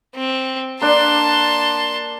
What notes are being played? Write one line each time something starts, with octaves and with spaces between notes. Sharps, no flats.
C4
A#3 D4 A5 C6